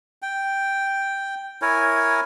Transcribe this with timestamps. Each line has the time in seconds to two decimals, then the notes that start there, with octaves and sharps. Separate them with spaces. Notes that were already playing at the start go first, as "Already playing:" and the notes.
0.22 G5
1.62 E4 A#4 C#5 G#5